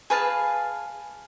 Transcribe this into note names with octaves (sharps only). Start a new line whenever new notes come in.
G#4 B4 F5 A5